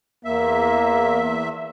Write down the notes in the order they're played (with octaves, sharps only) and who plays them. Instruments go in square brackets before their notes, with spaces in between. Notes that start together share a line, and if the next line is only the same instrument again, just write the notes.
[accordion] E2 E5 [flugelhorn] A#3